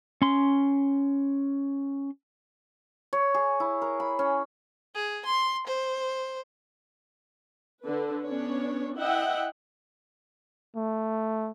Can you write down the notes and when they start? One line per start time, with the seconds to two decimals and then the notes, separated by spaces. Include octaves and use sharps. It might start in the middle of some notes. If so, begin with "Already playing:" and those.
0.22 C#4 C6
3.13 C#5
3.34 G#4
3.60 E4
3.82 A#4
4.00 B5
4.19 C#4
4.95 G#4
5.26 C6
5.67 C5
7.84 D3 B4
8.24 B3 C#4 D4 C#5
8.99 E4 D#5 E5 F#5 G5
10.76 A3